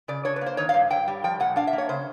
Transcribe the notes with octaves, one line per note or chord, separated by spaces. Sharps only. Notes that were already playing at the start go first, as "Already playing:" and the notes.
C#3 D5
D4 C#5
B4
A#3
C5
D#3 C#5
F5
G2
G2 G5
G3
F3 G5
A#2 F#5
D4 F5
E5
A#3
C#5
C#3 C5